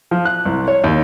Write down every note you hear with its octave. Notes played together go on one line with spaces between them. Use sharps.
F3
F#6
C2
C#5
D#2